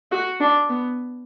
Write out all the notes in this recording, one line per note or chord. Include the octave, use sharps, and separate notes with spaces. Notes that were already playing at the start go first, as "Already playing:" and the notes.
F#4
D4
B3